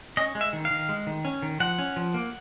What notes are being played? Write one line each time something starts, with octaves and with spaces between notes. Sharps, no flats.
C#4 D#5
G#3
E5
D#3
F5
D#3
G#3
D#3
C#4
D#3
F3 F#5
C#4
F3
A#3